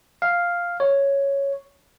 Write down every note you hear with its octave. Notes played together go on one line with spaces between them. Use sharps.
F5
C#5